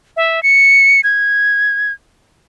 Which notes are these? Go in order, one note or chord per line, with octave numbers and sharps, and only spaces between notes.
E5
C#7
G#6